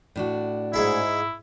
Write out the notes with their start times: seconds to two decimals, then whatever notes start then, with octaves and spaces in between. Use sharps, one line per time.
0.16 A2 D4 F#4
0.74 G#2 E4 G#4 E5